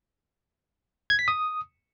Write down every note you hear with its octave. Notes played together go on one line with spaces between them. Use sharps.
G#6
B6
D#6